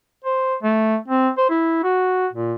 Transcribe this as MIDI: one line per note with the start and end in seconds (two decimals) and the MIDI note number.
0.25 0.55 72
0.63 0.97 57
1.08 1.29 60
1.38 1.49 72
1.50 1.83 64
1.83 2.27 66
2.33 2.56 46